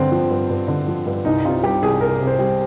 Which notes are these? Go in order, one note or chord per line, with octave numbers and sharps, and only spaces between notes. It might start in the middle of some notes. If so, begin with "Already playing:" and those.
Already playing: G2 D3 C4
F3
G2
G2
D3
F3
G2
C2 D#4
C3 F4
G3 G4
C2 G#4
C2 A#4
C3
C5
G3